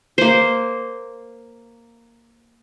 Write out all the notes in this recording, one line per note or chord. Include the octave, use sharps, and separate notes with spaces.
A#3 C5